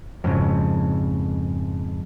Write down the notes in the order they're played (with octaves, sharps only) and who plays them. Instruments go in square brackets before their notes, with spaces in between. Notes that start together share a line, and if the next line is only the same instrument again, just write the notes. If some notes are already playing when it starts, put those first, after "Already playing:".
[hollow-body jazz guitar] F2 G#2 C#3